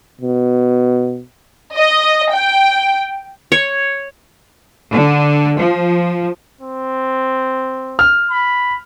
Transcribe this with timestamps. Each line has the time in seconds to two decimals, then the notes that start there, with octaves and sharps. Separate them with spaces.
0.21 B2
1.75 D#5
2.32 G5
3.52 C#5
4.94 D3
5.60 F3
6.61 C4
7.99 F6
8.31 B5